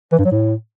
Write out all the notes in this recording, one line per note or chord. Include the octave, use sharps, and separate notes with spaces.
E3
G2
F#3
A2